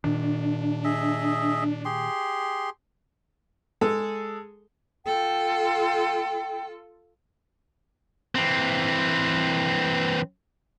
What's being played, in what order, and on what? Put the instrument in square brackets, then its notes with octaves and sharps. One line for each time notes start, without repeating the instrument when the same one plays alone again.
[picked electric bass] A#2 D#3 [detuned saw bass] D4
[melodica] G#4 D#5 E5
G4 G#4 C6
[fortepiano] G#3 G#4 A4
[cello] F4 A4 [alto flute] G5
[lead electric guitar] E3 C4